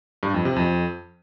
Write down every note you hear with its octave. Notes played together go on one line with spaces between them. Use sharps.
G2
F2
C3
F2